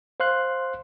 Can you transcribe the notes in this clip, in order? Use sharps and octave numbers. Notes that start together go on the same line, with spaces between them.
C5 F5 C6 F#6